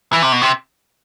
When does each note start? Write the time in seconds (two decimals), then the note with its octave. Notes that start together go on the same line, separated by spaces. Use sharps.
0.13 E3
0.22 C3
0.32 B2
0.41 C3